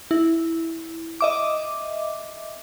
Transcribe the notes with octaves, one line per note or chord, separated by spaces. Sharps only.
E4
D#5 E5 D6